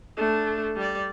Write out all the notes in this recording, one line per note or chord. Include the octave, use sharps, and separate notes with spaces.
A3 D4
G3 D5